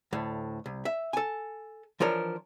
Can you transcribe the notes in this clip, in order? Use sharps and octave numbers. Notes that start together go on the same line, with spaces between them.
D2 A2
C2
E5
A4 G#5
E3 F3 D4 A#4 C#5